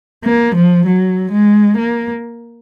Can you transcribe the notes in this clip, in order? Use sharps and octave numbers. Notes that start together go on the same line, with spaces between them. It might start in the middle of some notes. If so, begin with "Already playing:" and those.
A#3
F3
F#3
G#3
A#3